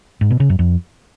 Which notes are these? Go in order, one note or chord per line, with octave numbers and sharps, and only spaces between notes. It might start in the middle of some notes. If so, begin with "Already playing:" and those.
G#2
B2
C#3
F#2
F2